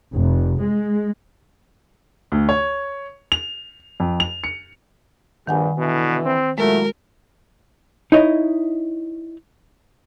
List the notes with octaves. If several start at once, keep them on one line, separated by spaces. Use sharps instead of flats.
F1
G#3
D2
C#5
F7
F2
F7
C#7
A#1 G2 D#3 F#5 G#5
B2 D3 E3
C4
A#2 F#3 G#3 A3 E4 F#4 A#4
D#4 E4 C#5 D#5